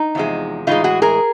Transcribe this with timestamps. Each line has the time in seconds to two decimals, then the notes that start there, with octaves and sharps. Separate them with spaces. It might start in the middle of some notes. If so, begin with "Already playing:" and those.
Already playing: D#4
0.15 E2 C3 F3 G#3
0.67 A2 E3 G#3 D#4 F4
0.84 F#4 G#4
1.02 G#4 A#4